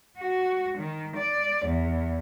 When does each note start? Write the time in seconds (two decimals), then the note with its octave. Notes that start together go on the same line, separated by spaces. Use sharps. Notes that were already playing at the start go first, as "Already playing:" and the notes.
0.17 F#4
0.76 D#3
1.16 D5
1.65 E2